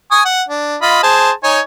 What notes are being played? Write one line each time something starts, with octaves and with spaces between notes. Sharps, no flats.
G#5 C#6 D#6
F#5
D4
F4 D#5 B5
G#4 C5 A5
D#4 C#5 G#5